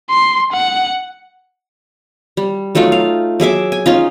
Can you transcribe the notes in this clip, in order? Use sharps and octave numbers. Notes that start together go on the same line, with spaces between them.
C6
F#5
G3
F#3 A3 D#4 F4
F5
F#3 G#4 E5 D6
G#5
C#4 D#4 F4